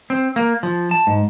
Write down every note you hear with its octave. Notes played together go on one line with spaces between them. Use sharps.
C4
A#3
F3
A5
G#2